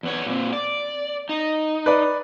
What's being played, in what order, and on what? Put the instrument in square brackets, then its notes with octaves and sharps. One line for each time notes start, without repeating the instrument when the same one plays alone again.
[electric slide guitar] E2 B3 C#5
A#2 B3 C4
D5
D#4
[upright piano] B4 D5